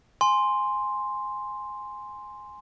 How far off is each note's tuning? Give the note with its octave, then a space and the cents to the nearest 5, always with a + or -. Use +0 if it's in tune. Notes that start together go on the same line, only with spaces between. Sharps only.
G#5 +0 C6 +0